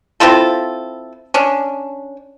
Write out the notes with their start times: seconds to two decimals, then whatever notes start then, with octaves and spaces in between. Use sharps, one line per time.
0.20 C4 E4 F4 A4
1.34 C#4 D4